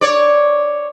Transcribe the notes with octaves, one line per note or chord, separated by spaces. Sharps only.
C#5 D5